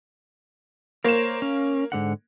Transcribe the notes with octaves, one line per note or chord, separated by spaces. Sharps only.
A#3 A#4 C5 C#5 E7
C#4
G#2 D3 F#5